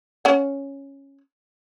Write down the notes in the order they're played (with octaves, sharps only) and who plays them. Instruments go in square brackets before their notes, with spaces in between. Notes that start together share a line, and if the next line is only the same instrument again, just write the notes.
[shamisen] C#4 F#5